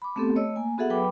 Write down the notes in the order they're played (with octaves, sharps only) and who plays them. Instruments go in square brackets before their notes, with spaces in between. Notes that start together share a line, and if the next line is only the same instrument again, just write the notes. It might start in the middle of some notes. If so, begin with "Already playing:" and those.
[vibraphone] B5 D6
A3 B3 C4 G4 A4
A3 C#5 D#5 E6
A#3 G#5
B3 F#4 G#4 A4 E5 F#5
F#3 B4 G5 B5 D6